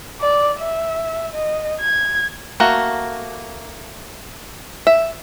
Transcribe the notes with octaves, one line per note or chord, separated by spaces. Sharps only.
D5
E5
D#5
G#6
A3 A#3 F#4
E5